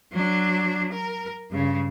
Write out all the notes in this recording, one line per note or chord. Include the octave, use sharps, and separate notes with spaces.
F#3 D4
A#4
G2 C#3